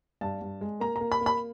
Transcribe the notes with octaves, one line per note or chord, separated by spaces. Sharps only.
G2 A5
G2
G#3
A#3 A#5
A#3 A#5
B5
A#3
B5